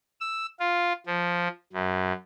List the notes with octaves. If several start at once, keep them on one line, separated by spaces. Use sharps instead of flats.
E6
F4
F3
F#2